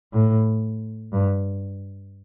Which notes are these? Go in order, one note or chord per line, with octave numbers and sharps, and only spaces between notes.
A2
G2